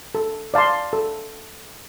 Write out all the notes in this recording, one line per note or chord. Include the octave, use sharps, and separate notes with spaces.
A4
D5 F5 A5 C6
A4